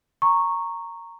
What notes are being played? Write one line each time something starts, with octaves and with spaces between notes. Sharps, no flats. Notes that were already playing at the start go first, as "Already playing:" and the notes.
A#5 C#6